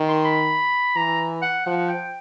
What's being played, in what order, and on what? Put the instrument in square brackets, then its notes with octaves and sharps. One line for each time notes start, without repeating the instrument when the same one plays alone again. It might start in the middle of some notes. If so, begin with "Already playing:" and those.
Already playing: [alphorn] D#3
[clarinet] C6
B5
[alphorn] E3 [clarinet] A#5
[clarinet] F#5
[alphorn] F3 [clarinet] F#5
[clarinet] G5